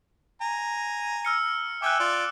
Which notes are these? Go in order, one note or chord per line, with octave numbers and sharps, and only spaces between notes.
G#5 A#5
E6 F6 C#7
E5 G5 G#5 D6 E6 F#6
F4 D5